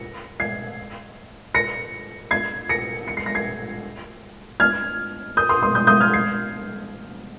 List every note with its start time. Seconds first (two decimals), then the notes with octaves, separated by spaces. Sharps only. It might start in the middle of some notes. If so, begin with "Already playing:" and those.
Already playing: A#6 C#7
0.40 G#6 C7
1.54 A#6 C#7
2.31 G#6 C7
2.69 A#6 C#7
3.08 C#7
3.17 C7
3.26 A#6
3.35 G#6 C7
4.60 F6 G#6
5.37 D#6 G6
5.49 C6 D#6
5.62 C6 D#6
5.75 D#6 G6
5.87 D#6 G6
6.00 F6 G#6
6.13 G#6 C7